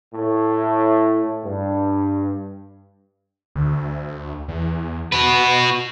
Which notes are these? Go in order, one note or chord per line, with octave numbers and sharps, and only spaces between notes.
A2
G2
D2
E2
B2 F#4 B4